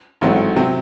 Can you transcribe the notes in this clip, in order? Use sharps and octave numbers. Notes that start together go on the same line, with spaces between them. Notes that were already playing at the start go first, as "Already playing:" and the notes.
A1 G#2 F#3 A3 C4
C3 F#3 C4